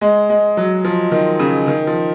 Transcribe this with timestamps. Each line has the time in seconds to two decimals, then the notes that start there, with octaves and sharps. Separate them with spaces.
0.01 G#3
0.29 G#3
0.57 F#3
0.84 F3
1.11 D#3
1.39 C#3
1.68 D#3
1.87 F3